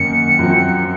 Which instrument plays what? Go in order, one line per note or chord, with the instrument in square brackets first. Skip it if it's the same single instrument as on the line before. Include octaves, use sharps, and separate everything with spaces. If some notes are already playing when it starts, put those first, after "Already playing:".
Already playing: [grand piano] F#2 D#3 A#3 C#4 [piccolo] C#7
[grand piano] F#2 F3 C4